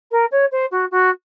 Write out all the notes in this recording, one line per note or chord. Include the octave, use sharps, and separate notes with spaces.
A#4
C#5
C5
F#4
F#4